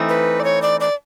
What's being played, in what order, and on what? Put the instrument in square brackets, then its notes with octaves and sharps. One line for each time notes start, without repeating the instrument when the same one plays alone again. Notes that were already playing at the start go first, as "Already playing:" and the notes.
Already playing: [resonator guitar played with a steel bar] E3 A3 C4 D#4
[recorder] B4
D5
C#5
D5
D5